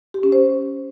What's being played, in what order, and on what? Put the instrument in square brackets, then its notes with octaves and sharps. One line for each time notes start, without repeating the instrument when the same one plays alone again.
[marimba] G4
C#4
C5